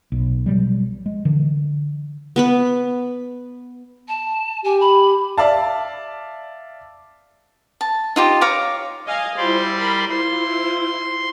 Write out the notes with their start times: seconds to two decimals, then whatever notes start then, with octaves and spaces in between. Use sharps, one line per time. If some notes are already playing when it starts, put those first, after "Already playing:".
0.12 B1
0.46 B2 F#3 G3
1.06 G#3
1.25 D3 E3
2.36 B3 B4 B5
4.08 A5
4.64 G4 G#5
4.80 B5
5.38 D5 E5 F5 A5
7.81 A5
8.16 D#4 F4 G4
8.41 C#5 F5 A#5 D6
9.07 D#5 F5 G#5
9.37 G3 E4 F4 C5 D5 C6
9.78 A#4 B5
10.09 E4 F4 C5 C6